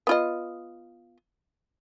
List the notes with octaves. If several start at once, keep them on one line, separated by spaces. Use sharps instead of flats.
B3 F4 D#5